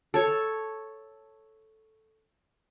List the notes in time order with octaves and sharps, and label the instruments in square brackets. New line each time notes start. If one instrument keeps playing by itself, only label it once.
[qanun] A4 C#5